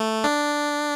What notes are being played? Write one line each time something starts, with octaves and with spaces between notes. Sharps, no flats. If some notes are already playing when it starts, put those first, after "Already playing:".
Already playing: A3
D4